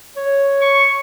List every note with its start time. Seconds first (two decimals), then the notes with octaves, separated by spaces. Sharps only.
0.17 C#5
0.61 C#6